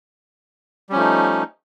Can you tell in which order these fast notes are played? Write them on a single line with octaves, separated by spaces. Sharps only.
G3 C#4 F3 A3 D#4